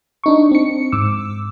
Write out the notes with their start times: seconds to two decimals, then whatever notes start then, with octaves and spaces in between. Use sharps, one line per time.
0.24 D4 D#4 C#6
0.51 C4 C#7
0.92 G#2 D6 E6